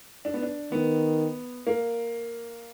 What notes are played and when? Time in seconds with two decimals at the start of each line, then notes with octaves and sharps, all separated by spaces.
0.25 D4
0.34 B3
0.42 D4
0.72 D#3 B3
1.67 A#3